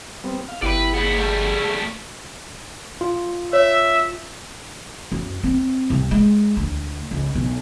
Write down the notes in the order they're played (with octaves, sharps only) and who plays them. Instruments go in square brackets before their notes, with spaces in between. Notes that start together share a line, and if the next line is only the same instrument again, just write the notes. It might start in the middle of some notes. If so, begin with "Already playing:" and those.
[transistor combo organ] G3 B3 C4
F5
[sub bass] G1 [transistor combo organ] B3 E4 G4 [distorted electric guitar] B4 D5
[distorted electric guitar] D#2 B3 [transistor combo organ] G#4
[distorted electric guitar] G3 A3
[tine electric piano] F4
[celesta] C#5 [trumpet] E5
[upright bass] F#2
C4
C2
G#3
D2
C#2
B1